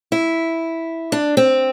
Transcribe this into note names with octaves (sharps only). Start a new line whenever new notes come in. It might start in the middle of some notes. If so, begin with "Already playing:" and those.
E4
D4
C4